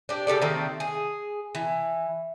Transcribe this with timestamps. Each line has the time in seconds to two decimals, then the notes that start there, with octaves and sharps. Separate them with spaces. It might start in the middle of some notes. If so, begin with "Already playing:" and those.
0.09 D4 G4
0.27 C#3 G4 A4 D5
0.42 D#3 A3 A#3 C4
0.80 G#4
1.55 E3